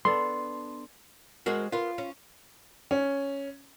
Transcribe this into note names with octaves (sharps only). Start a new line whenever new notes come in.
B3 D4 A4 C6
G#3 F#4 A#4 C5
B3 F4 A#4
C#4
C#4